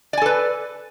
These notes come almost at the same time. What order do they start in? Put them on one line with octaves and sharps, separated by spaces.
D5 G#5 A4 B4